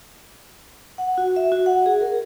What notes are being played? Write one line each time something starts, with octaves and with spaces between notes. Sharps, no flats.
F#5
F#4
E5
F#4
F#5
G#4
A#4